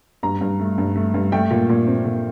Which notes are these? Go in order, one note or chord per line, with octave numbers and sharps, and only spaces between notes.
G2 A#5
G2
A3
G2
A3
G2
A3 G5
A#2
A#2
C4
A#2